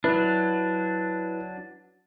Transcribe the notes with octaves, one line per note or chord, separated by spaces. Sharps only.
F#3 D4 E4 B4